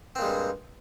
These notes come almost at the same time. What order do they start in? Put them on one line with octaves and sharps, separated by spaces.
C4 A#2 G#3 G2